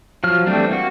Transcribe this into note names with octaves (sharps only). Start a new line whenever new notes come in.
F3 F#3 F6
E3 G3 A3 C4 D4
A#3 F#4